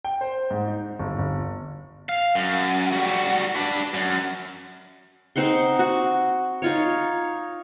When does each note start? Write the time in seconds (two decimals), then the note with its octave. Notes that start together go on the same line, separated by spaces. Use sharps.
0.05 G5
0.21 C5
0.50 G#2
0.68 D#4
0.99 G1
1.19 G1
2.09 F5
2.35 F#2
2.93 G3 F#4
3.56 D4 B4
3.94 F#2
5.36 C4 D#4 F#5 C6
5.79 F#4
6.62 D#4 F4 C#5